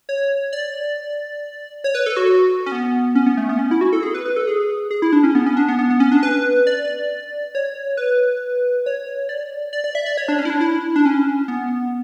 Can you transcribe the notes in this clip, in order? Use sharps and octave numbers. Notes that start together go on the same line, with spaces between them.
C#5
D5
C#5
B4
A4
F#4
C#4
B3
C#4
B3
A3
B3
C#4
E4
F#4
A4
G#4
B4
B4
A4
G#4
G#4
E4
D4
C#4
B3
C#4
D4
B3
B3
B3
C#4
D4
B4
D5
C#5
B4
C#5
D5
D5
D5
E5
D5
C#5
D4
C#4
E4
D4
E4
D4
C#4
B3